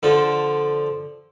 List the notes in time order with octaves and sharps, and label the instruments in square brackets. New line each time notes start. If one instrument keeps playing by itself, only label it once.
[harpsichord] D3 F3 A4